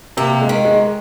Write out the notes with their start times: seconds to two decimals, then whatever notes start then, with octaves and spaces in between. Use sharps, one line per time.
0.17 C3 A#3
0.41 G#3
0.49 D#3
0.65 G#3